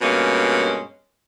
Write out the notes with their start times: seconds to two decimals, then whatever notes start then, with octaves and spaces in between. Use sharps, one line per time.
0.02 G2 B2 G#3 A#3 C#4